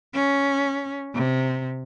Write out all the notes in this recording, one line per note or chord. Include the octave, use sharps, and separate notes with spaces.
C#4
C3